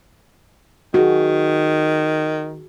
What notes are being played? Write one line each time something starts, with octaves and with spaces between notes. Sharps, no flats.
D#3 F#4 G#4